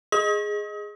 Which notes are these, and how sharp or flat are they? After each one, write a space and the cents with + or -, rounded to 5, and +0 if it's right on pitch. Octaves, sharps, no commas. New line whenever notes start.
G#4 +0 D#5 +0 D#6 +35